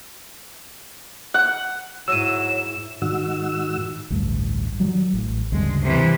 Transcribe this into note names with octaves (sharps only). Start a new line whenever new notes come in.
F#5
G#2 F#3 E4 E6 D#7 E7
G#2 D#3 F#4 E6
A1 D2 G2
D#3 F#3 G3
A1
D2 G2 C#3 G#3
C3 E3